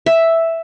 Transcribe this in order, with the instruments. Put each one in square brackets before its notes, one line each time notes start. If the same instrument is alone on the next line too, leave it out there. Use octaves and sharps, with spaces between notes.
[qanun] E5